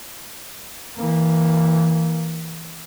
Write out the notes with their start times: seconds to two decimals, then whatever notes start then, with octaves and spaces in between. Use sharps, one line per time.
0.97 E3 A#3